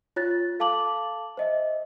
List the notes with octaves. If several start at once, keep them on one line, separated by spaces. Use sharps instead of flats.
F4 C#5 F#6 A6
A4 F5 A5 D6 F#7
C5 D#5 E5